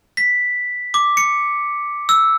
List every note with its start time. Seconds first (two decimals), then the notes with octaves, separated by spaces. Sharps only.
0.17 B6
0.94 D6
1.17 C#7
2.09 E6